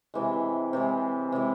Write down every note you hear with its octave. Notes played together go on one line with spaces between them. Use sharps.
C3 E3 G#3
C3 E3 G#3
C3 E3 G#3